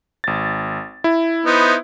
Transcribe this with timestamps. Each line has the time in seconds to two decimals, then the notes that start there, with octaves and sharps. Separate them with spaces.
0.24 G#1 A6
1.04 E4
1.45 B3 D#4 C5